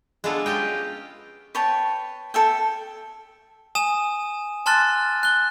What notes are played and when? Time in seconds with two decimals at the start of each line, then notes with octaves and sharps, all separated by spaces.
0.24 G#3 B3 D4 F4 A4
0.46 C#4 F4 G4 D#5 G5
1.55 B4 C#5 G5 A5
2.34 A4 E5 G5
3.75 G#5 D#6 E7
4.66 G#5 A5 C6 F6 F#6 A6
5.23 F#6 G7